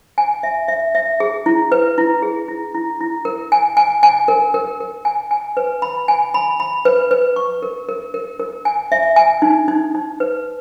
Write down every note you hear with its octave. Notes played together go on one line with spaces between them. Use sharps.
G#5
E5
E5
E5
G#4
E4
B4
E4
G#4
E4
E4
E4
A#4
G#5
G#5
G#5
A#4
A#4
A#4
G#5
G#5
B4
B5
G#5
B5
B5
B4
B4
C#6
A#4
A#4
A#4
A#4
G#5
E5
G#5
D#4
D#4
D#4
B4